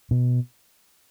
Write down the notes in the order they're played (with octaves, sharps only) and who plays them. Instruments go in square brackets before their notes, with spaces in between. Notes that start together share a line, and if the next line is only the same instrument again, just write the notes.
[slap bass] B2